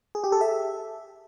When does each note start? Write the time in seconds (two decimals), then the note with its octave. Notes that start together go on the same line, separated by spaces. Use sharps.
0.15 G#4
0.24 G4
0.32 A4
0.41 E5